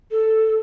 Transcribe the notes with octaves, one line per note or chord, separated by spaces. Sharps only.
A4